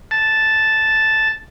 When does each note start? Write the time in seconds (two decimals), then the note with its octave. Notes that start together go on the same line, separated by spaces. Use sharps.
0.11 A5